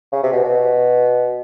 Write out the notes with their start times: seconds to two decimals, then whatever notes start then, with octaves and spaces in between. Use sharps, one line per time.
0.12 C#3
0.23 C3
0.32 B2
0.43 B2